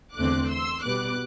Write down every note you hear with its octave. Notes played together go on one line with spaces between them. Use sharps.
E2 D3 A3 C4 D6 F#6
C6 E6
B2 G3 B3 D6 F#6